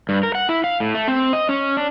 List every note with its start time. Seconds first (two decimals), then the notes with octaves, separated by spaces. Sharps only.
0.09 G2
0.23 A#4
0.35 F#5
0.49 E4
0.64 F5
0.80 A2
0.94 A3
1.08 C4
1.33 D#5
1.49 C#4
1.77 D4